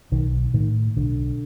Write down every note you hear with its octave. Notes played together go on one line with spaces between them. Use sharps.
B1 D#3
A2 D#3
B1 D3